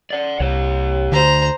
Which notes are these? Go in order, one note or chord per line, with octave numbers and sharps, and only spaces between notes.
D5 F#5
C2 G4 C#5
D2 D3 C5 A#5